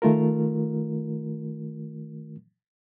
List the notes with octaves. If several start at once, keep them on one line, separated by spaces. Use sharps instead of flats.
D#3 A3 F4 A#4